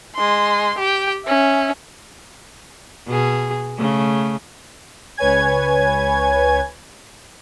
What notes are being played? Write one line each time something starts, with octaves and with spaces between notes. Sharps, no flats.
G#3 C6
G4 G5
C#4 E5
B2 G#4
C#3 A3
C#2 B4 C#5 G#5 G#6